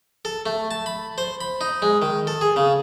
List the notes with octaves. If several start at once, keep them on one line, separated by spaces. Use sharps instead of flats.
A4
A3
A5
B5
C5
B5
D#4
G#3
D#3
A4
G#4
C#3